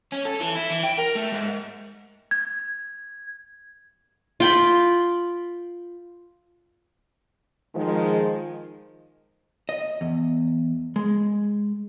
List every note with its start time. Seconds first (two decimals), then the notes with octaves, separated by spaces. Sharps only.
0.12 C#4
0.25 A4
0.41 E3
0.55 E4
0.70 E3
0.83 G5
0.98 A#4
1.15 A3
1.32 G#2
2.31 G#6
4.40 F4 G5 B5
7.75 D#3 F3 G#3
9.69 D#5
10.01 E2
10.96 G#3